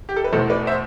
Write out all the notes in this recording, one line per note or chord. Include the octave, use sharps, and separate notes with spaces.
G4
A4
B4
E2 B2 A3 A4 C5
B4 D5
C5 E5